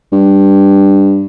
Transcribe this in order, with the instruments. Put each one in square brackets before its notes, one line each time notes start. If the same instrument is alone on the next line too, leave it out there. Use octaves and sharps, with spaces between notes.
[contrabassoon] G2